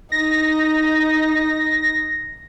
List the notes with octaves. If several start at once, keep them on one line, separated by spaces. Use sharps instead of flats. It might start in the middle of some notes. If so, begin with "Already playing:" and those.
D#4 A#6